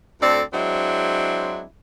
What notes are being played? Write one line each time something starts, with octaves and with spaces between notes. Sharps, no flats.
D2 C4 A4 D5
F#3 G#3 C4 D4 E4